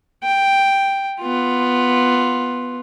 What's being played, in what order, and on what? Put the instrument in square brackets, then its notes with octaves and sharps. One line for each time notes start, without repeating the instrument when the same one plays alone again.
[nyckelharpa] G5
B3 F4